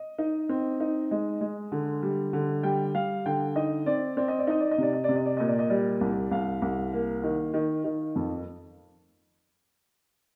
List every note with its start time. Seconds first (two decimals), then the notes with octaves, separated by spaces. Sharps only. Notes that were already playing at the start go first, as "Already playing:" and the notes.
Already playing: D#5
0.18 D#4
0.49 C4
0.80 D#4
1.11 G#3
1.41 G#3
1.72 D3
2.02 G3
2.33 D3
2.63 G3 G5
2.94 G3 F5
3.26 D3 G5
3.56 D#4 D#5
3.86 C4 D5
4.17 C4 D5
4.28 D#5
4.39 D5
4.47 D#4 D#5
4.60 D5
4.71 D#5
4.78 C3 D5
4.93 D#5
5.04 C3 D5
5.16 D#5
5.26 D5
5.37 A#2 D#5
5.48 D5
5.59 D#5
5.69 G3 D5
6.01 C2
6.31 C2 F5
6.62 C2
6.93 A#3
7.23 D#3
7.54 D#3
7.84 D#3
8.16 F2